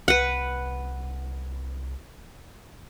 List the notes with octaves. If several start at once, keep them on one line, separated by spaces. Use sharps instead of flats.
C2 B4 F#5